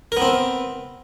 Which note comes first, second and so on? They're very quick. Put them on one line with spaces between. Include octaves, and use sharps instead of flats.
A#4 B3 C4